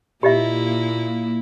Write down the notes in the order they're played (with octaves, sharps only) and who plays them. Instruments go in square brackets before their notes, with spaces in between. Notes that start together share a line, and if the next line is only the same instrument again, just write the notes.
[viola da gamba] A#2 A#3 E4 [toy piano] G4 D#5 E5